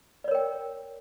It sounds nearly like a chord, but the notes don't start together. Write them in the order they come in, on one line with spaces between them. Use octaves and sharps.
D5 C#5 A#4 G5